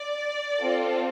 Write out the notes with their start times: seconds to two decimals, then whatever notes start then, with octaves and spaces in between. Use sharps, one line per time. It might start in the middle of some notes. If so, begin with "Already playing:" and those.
Already playing: D5
0.61 C4 F4 A4